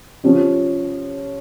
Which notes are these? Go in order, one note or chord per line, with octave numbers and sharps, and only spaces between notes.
F3 C#4 G4